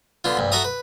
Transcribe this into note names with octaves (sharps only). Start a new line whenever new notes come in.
D3 B3 F4
A#1 G2
F#4 A4 E5 A#5 D#6
B4